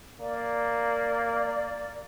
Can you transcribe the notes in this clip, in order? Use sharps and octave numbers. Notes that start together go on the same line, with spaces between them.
A#3 D5